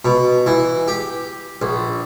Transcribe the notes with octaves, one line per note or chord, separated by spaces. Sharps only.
B2
E3
G4
A#1